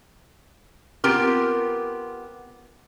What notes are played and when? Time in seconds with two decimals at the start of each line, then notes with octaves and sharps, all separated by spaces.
1.04 B3 C4 F4 G4 A#4